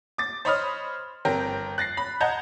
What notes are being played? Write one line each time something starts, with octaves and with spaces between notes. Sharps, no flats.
D6 A6
C5 C#5 D#5 B5 D#6 F6
G1 C4 A#4 G5
F#6 A6 A#6 C7
B5
D#5 F#5 A5 A#5 G6 G#6